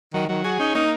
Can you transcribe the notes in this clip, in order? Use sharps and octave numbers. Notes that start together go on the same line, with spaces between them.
D#3 F#3
D#3 F#3
F#4 G#4
C#4 D#4
A#3 D#4